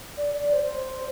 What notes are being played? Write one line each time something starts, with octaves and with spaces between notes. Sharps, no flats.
D5
D5
C5